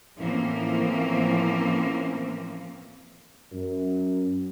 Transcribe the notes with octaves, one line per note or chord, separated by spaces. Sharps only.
A2 E3 F3 A#3 C4 C#4
F#2